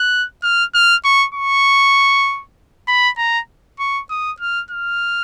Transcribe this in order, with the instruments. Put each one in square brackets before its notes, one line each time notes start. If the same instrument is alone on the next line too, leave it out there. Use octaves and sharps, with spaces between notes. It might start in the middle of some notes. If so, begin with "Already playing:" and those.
Already playing: [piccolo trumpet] F#6
F6
F6
C#6
C#6
B5
A#5
C#6
D#6
F6
F6